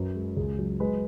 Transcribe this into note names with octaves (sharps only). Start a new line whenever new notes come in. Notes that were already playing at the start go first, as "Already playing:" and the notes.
Already playing: F#2 F#3 B4
G#3
C#2 G#4
F#3
G#3 B4